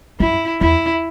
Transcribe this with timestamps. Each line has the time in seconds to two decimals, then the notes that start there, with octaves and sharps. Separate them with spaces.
0.19 F#2 E4
0.61 E2 E4